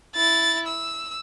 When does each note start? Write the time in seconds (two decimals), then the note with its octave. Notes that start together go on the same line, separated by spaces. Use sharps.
0.16 E4 A6
0.67 E6